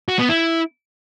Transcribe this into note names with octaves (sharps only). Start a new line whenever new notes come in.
F#4
B3
E4